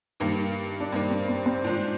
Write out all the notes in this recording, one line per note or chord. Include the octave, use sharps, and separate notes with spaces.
G2 D#3 A#3
D4
G2 D#3 A#3 C4
C4
C4
C4
G#2 D#3 A#3 D4 F4